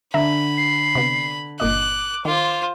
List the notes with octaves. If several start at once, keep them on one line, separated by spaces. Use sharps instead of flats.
D3 E5 A#5 B5
C7
C3 B3
G1 A#2 D#5 D6 F#6
D#3 F4 C5